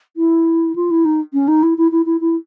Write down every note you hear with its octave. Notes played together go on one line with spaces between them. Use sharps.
E4
F4
E4
D#4
C#4
D#4
E4
E4
E4
E4
E4